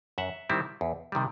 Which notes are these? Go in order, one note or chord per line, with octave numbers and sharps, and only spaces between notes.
F#2 E5 F#5
D#3 G3 C4 E4
E2
C3 D#3 G3